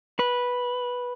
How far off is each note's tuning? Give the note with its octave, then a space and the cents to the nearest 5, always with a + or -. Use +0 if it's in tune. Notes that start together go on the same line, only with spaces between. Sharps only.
B4 -10